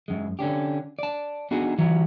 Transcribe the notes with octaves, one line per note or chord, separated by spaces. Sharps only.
F#2 G#3
D3 C#4 D4 G4
D5 A5
B3 D4 D#4 F#4 G#4
E3 F#3 G3